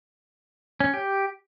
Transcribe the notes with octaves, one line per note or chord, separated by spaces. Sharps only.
C#4
G4